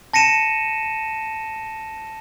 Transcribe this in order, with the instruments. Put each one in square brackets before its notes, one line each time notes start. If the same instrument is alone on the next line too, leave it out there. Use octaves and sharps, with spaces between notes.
[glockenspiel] A5 A#6 C#7 D#7 E7